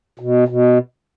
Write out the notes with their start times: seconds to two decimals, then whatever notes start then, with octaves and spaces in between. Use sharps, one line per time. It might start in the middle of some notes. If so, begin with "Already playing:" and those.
0.19 B2
0.48 B2